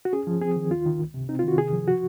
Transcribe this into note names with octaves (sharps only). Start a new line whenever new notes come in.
F#4
C#4 G#4
F3
C4 G#4
D#3
D#2 F4
D#3
C#2
C3
C4 D#4
F4
D#3 F#4
C3 G#4
F3
F#4